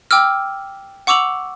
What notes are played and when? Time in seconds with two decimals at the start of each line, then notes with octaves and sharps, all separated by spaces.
0.11 G5 D6 E6 F6
1.07 F#5 C#6 D6 E6 F7 F#7